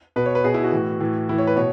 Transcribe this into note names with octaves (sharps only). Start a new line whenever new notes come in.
B2 B4
C#5
B4
B2 G#4
E4
F#4
A2 E3
A2 E3
A2 E3 E4
C#5
B4
B2 C#5